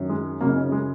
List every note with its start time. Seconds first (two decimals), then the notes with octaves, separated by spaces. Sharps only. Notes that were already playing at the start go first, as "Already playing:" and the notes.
Already playing: F#2 D#3
0.09 G#3
0.41 F#2 C#3 A#3
0.49 D#4
0.56 C#4
0.72 G#3